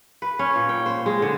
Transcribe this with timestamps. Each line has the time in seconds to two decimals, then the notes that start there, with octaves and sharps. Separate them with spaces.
0.22 B4
0.39 C#4
0.56 A#2
0.69 G5
0.86 C5
1.06 G#3
1.22 D3